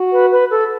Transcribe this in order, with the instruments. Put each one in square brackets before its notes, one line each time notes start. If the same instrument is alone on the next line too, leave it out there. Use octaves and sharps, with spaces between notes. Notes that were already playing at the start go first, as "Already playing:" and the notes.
Already playing: [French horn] F#4
[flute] B4
B4
A4